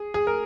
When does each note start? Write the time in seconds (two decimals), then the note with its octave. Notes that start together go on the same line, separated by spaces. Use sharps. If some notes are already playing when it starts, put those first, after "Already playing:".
Already playing: G#4
0.14 G#4
0.27 A#4